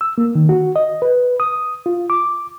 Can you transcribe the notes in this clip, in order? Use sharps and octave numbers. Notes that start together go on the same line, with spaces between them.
E6
A#3
D#3
F#4
D#5
B4
D#6
F4
D6